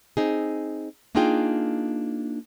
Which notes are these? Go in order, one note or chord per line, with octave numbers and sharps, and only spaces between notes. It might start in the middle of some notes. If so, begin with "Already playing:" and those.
C4 D#4 G#4
A#3 D4 D#4 F4 G#4 G5